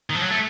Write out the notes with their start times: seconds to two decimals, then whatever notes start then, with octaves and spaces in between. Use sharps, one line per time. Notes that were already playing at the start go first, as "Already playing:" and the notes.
0.10 D#3
0.15 F3
0.22 F#3
0.31 A3